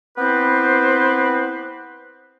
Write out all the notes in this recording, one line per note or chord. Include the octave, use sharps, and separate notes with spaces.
B3 C4 E4 G4 B4 C5